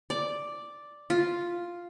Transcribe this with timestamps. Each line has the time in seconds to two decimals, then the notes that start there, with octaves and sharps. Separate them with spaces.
0.10 D5
1.10 F4